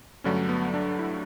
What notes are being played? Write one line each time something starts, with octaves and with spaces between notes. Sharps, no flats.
G2 D3 F#3 A3 C#4
B3
D4
E4